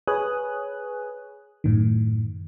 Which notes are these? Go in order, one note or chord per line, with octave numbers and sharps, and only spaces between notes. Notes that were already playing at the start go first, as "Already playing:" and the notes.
G#4 B4 C#5 G#5 D#6 F#6
F#2 A2 D#3